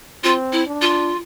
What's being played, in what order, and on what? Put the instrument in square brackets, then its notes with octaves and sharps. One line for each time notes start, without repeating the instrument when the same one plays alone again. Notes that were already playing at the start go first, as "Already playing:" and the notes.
[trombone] C4 [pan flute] F4
[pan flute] E4
[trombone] D4
[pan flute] F4